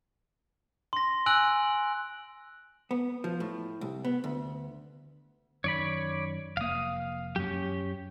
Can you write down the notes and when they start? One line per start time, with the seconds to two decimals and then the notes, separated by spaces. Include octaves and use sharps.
0.93 C6 A#6
1.26 G#5 E6 F#6 D7 F#7
2.91 B3
3.24 F3
3.40 A2
3.81 C2
4.05 B3
4.24 D2
5.64 F#2 D#3 C#5 D5 B5
6.57 F1 A#3 F5 D#6
7.36 F#2 F#3 C#4 G4